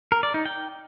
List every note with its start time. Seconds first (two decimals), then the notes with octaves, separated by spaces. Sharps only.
0.12 A#4
0.23 D5
0.34 D#4
0.46 G5